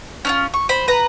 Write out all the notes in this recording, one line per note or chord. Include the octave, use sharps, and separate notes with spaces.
C#4 D4 F4
C#6
C5 B5
B4 A#5